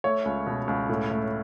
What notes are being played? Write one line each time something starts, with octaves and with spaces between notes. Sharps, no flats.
A3 C#5
C#2
B2
C#2
A2
A3